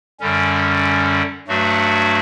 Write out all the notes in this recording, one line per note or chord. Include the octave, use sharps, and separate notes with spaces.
F#2 D3 G3 C#4
G2 F#3 A3 D4 F#4